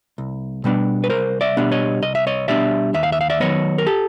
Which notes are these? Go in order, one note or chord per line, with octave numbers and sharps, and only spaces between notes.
C2
B2 G3 B3 D4
B4
C2 A#4 C5
D5 E5
B2 G3 B3 D4
C#5 D#5
C2 D#5
E5
C#5 D#5
B2 G3 B3 D4 D5 E5
D#2 E5
F5
E5
F5
D5 E5
D#3 F#3 B3 C#5 D#5
A#4
G4 A4